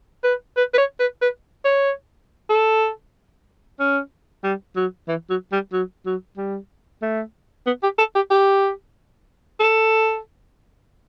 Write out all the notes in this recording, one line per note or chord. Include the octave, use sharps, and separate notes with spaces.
B4
B4
B4
C#5
B4
B4
C#5
A4
C#4
G3
F#3
E3
F#3
G3
F#3
F#3
G3
A3
B3
G4
A4
G4
G4
A4